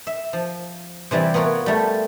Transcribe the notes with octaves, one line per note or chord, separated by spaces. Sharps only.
E5
F3
C3 E3 G3 D5
B3 F4 A#4 C#5 F#5
G3 A3